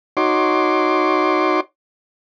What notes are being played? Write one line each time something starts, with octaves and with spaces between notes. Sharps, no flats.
D#4 F#4 C#5 C6 D6